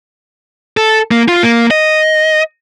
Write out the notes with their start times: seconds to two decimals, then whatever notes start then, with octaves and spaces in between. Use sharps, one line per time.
0.77 A4
1.11 A#3
1.28 F4
1.43 A#3
1.71 D#5